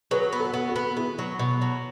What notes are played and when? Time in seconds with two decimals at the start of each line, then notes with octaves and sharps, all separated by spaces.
0.11 F#3 G#4 B4
0.33 B3
0.39 F#4 A4
0.54 B3
0.68 F#4 A4
0.76 B3
0.96 B3 E4 G#4
1.19 F#3
1.39 B2
1.61 F#3